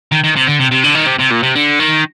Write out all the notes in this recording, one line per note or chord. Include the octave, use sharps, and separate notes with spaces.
D#3
D#3
C3
D3
C3
C3
D3
D#3
C3
C3
A#2
C3
D3
D#3